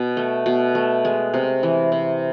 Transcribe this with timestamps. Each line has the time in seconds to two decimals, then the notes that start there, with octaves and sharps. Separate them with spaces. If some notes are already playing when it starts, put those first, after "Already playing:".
Already playing: B2
0.17 A3
0.46 B2
0.75 A3
1.05 G#3
1.34 C3
1.63 E3
1.92 C3